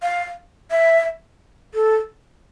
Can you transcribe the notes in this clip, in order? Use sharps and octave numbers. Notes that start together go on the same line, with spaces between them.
F5
E5
A4